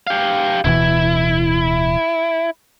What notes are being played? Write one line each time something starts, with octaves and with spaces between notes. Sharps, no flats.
G4 F5
D1 B2 E3 E4